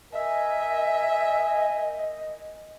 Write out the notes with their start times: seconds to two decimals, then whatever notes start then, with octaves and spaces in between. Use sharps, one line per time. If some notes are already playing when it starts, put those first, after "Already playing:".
0.14 A#4 D#5 E5 G#5